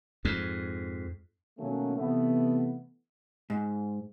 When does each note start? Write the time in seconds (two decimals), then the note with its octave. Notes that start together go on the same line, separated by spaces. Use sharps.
0.25 F2 G#2
1.59 B2 D#3 F#3 A3 A#3 C#4
1.97 C3 E3 A3 B3
3.50 G#2